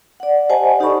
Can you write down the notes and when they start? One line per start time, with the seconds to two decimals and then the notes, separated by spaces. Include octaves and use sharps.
0.20 D5 F#5
0.49 G4 C5 D#5 F#5 G#5 A5
0.80 D#4 G4 A4 D5 B5 C#6